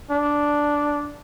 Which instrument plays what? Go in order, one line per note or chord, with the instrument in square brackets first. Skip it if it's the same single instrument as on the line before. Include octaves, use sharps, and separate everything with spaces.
[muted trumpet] D4